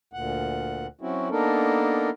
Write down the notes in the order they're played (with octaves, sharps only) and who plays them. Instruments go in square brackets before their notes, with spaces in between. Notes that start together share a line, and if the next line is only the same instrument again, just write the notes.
[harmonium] D2 A#2 F#5
F#3 C4 C#4 E4 F#4
A#3 B3 D4 D#4 A4 A#4